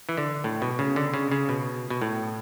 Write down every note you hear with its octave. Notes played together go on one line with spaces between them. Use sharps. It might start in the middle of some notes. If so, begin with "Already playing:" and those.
E3
D3
A2
B2
C#3
D3
C#3
C#3
B2
B2
A2